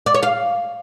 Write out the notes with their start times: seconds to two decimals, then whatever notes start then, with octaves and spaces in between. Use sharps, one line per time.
0.06 D5
0.14 C#5
0.23 F5